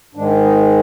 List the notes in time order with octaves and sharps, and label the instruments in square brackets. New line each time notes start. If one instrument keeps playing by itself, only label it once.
[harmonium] G#2 D#3 G#3 D4
D#4